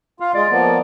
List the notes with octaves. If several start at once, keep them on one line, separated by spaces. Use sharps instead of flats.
F4 F5
G#3 F4 D5
F3 A#3 B3